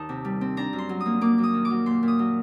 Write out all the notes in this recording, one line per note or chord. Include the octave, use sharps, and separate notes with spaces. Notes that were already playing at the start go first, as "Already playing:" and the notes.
Already playing: D#2 D#3 D#4 A5
C3
G3
C4
D4 A#5
F#2
C6
F#3
D#6
A#3
A#3 D6
F#2
D#6
D#3
D6
F#3
A#2 C6
A#2
D#6
F#3